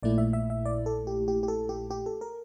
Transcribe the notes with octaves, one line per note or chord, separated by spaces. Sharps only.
A#1 A#2 A3 E4 D5
E5
E5
E5
D5
A4
G4
G4
G4
A4
G4
G4
A4
A#4